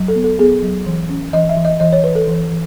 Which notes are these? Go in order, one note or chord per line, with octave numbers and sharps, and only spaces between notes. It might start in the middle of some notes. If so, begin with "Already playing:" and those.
Already playing: F#3
A4
B3
A4
B3 G#4
F#3
E3
C#4
E3 D#5
E5
E3
D#5
E3 D#5
C#5
E3 B4
A4
E3
E3